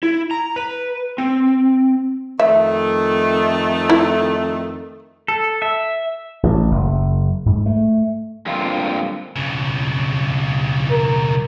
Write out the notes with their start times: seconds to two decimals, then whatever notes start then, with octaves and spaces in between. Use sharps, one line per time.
0.03 E4
0.31 A#5
0.56 B4
1.18 C4
2.40 F2 D#3 A3 E5
3.90 E4
5.28 A4
5.62 E5
6.43 A1
6.71 F#1
7.46 G#2
7.66 A3
8.46 G2 D3 A#3 C4 F4
9.36 B1 C#3
10.90 A#4